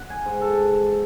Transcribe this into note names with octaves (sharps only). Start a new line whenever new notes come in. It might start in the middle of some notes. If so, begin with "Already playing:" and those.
Already playing: F#5
G#5
G#2
A4